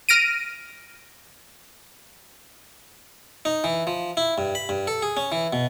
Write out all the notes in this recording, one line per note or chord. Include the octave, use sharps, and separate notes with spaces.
F6 A#6 D7 D#7
D#4
E3
F3
E4
G2
B5
G2
A4
G#4
C#4
E3
B2